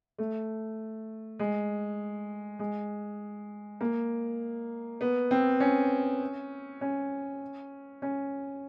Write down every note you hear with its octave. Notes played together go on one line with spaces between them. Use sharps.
A3
G#3
G#3
A#3
B3
C4
C#4
C#4
C#4